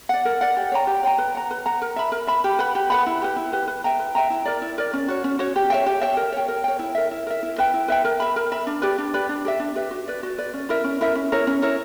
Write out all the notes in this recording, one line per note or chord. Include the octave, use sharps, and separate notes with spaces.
D5 F#5
A#4
D5 F#5
G4
C#5 G5 A#5
G4
C#5 G5 A#5
B4
F#5 A#5
B4
F#5 A#5
A#4
E5 B5
A#4
E5 B5
G4
B4 F#5 B5
G4
B4 F#5 B5
E4
G4 B4
E4
G4 B4
B4
E5 G5 A#5
B4
E5 G5 A#5
E4
A#4 D5
E4
A#4 D5
C#4
F#4 C#5
C#4
F#4 C#5
G4
C#5 E5 G5
G4
C#5 E5 G5
A#4
C#5 G5
A#4
C#5 G5
E4
A#4 E5
E4
A#4 E5
E4
B4 E5 G5
E4
B4 E5 G5
A#4
E5 B5
A#4
E5 B5
D4
G4 B4 D5
D4
G4 B4 D5
D4
G4 B4 E5
D4
G4 B4 E5
F#4
B4 D5
F#4
B4 D5
C#4
E4 A#4 E5
C#4
E4 A#4 E5
C#4
E4 A#4 C#5
C#4
E4 A#4 C#5